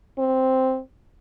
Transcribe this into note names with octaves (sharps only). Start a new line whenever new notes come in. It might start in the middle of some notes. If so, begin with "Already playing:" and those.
C4